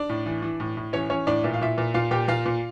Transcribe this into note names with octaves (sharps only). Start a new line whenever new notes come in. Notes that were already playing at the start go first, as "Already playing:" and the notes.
Already playing: D4 D5
A2
E3
E3
A2
A2
E3 C#4 C#5
E3 C#4 C#5
A2 D4 D5
A#2 E5
F5
A#2 E4 E5
A#2
A#2 F4 F5
A#2 G4 G5
A#2 F4 F5
A#2